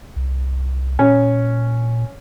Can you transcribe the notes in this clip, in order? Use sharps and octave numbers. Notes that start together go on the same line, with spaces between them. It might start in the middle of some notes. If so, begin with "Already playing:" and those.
C2
A#2 C#4